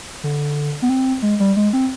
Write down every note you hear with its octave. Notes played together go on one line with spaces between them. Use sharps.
D3
B3
C4
G#3
G3
G#3
C4